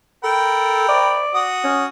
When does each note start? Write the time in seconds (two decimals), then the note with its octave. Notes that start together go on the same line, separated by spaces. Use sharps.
0.24 A4 A#4 G5 B5
0.89 D5
1.35 F#4 D#6
1.64 C#4